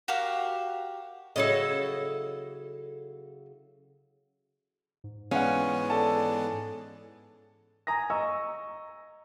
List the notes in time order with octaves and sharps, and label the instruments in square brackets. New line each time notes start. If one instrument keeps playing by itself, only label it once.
[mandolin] F#4 G4 A#4 F5
[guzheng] C#3 F#3 E4 [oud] A4 C#5 D#5
[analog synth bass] G#2
[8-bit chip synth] E3 G#3 B3 [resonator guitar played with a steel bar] C#4 [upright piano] F5 F#5
[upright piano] A4 D5 A5
[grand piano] G#5 A#5 D#6 A#6
D#5 A#5 C#6 E6